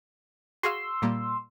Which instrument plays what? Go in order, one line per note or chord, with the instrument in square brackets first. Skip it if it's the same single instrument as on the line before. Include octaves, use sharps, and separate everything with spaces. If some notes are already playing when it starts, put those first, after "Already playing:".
[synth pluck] F#4 G#4 F5 [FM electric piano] C6 E6
[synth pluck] A#2 G3 A#3